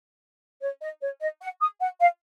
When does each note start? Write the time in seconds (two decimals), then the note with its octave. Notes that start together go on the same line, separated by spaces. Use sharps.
0.62 C#5
0.82 D#5
1.02 C#5
1.21 D#5
1.41 F#5
1.61 D#6
1.81 F#5
2.00 F5